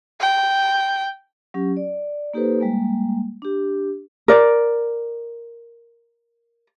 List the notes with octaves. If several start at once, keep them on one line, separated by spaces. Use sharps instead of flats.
G5
F#3 C#4 G4
D5
A#3 D#4 G4 A4 B4 C5
G3 G#3 A#3
D4 G4
A#4 D5